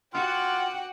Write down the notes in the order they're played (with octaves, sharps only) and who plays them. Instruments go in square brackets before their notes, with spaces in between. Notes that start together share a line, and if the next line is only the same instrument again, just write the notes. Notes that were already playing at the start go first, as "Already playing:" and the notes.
[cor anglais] F4 [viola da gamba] F#4 [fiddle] F#5 [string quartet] G5 D6